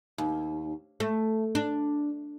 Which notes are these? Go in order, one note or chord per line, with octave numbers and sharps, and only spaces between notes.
D#2
A3
D4